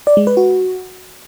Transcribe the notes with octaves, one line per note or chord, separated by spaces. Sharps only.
D5
G#3
B4
F#4